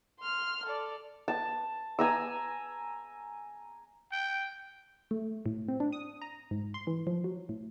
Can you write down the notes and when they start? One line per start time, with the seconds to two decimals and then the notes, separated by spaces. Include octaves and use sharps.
0.19 C6 F6
0.65 A4 D5
1.28 A5
1.99 G#5 A#5 E6
4.12 G5
5.11 A3
5.46 A2
5.69 C4
5.80 D4
5.93 D#6
6.22 A#5
6.51 G#2
6.74 C6
6.87 E3
7.07 F3
7.24 F#3
7.49 A2